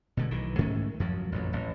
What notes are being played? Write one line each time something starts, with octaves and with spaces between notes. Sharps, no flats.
B2 D3 G#3
B1 D#3 E3
G#2 D#3 A3 C#4
F#2 F3 F#3
A1 F2 A#2 F#3
A1